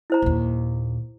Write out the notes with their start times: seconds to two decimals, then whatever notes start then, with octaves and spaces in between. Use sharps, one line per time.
0.10 E4 C5 A#5
0.22 D#2 A#2